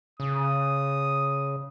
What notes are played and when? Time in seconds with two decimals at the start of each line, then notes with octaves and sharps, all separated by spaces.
0.20 C#3 D#6